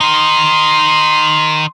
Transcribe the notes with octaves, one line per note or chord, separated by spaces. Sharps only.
D#3 D#4 C6